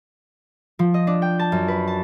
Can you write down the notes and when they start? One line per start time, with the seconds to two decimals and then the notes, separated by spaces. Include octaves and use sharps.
0.79 F3
0.94 D#5
1.07 D4
1.22 G5
1.39 A5
1.52 F#2
1.68 B4
1.87 A5